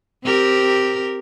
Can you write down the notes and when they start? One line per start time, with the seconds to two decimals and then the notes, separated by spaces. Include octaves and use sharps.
0.24 C4 G4 A#4